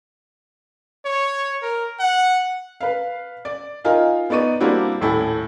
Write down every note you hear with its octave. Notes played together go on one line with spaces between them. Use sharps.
C#5
A#4
F#5
B4 F5
D5
D#4 F4 A#4 D#5 F5 G#5
B3 D#4 D5 C#6 D#7
G3 A#3 C4 D4 E4 F#4
D#1 A2 E4 A4 G#5